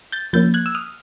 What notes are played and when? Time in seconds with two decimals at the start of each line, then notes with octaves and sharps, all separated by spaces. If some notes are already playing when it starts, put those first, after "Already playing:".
0.12 G6 A6
0.33 F3 A#3 C#4 G6 A6
0.54 F#6 G#6
0.66 E6
0.75 D#6 F6